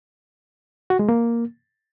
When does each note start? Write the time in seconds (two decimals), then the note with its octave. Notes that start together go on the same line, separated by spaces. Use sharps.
0.90 F#4
0.99 G#3
1.09 A#3